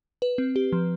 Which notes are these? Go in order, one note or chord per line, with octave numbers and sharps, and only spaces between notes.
B4
C4
G4
F3